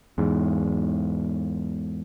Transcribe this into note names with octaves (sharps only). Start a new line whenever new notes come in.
E2 G#2